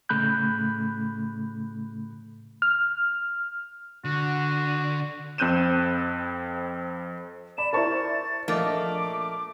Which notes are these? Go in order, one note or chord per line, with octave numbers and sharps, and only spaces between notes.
A2 C#3 A3 B5 F#6 G6
F6
D3 F#4
F2 C4 F#6 G6 D#7 E7
D5 B5 E7
E4 A#4 C5 D5 A5 C#6 A6
A#1 A3 A#3 D#5 D6 A6